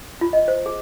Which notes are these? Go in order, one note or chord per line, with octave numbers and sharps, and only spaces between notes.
F4
D#5
C5
G#4